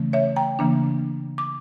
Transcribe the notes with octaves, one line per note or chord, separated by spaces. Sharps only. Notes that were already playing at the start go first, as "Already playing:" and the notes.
Already playing: C#3 E3 A3 C#4
C#5 E5
G5 A#5
C#3 E3 A#3 D4
D6